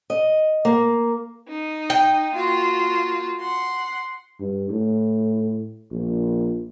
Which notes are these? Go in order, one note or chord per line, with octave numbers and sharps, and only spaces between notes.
D#5
A#3
D#4
G5
A#3 F4 F#4
F#5 C6
G2
A2
A#1